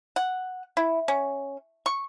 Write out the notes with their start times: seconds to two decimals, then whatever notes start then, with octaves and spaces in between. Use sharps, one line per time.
0.16 F#5
0.77 E4
1.08 C#4
1.86 C#6